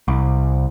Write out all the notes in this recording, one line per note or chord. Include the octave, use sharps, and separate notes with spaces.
C2